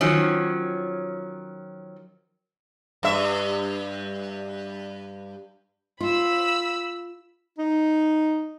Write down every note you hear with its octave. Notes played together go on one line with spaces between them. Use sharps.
D#3 F3 F#3 C#4
G2 E5
F4 B5 E6
D#4